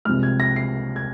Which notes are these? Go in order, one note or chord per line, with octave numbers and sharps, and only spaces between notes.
C2 C3 F3 G#3 F6
G#6
A#6
C7
G#6